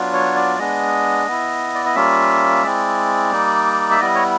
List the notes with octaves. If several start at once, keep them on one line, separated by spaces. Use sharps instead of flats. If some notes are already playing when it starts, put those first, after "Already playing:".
Already playing: F#3 B3 D4 F4
C#5
D5
G#3 B3 D4 D#5
B3 E4
D5
D#5
G3 A#3 C#4 F4 E5
G#3 C4 E4 D5
G3 A#3 D#4
E5
G3 B3 E4 D#5
C#5